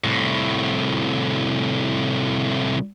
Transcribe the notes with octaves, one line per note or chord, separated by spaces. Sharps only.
C2 A2